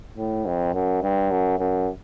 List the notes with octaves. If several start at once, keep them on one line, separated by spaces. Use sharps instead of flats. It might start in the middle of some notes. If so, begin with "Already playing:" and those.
A2
F2
F#2
G2
F#2
F#2